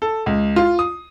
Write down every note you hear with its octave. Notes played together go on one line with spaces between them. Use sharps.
A4
C#2
F4
D#6